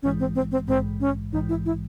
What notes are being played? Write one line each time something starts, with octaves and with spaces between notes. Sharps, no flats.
A#1 G#2 E3 G#3 C#4
C4
C4
C4
A#1 G#2 E3 G#3 C4
C#4
A#1 G#2 E3 G#3 D#4
E4
E4